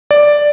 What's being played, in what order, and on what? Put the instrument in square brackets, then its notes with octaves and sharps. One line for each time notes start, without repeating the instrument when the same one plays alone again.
[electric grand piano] D5